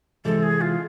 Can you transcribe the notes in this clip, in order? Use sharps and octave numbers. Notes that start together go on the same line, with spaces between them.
C3 E3 G#3 A4
G#4
F4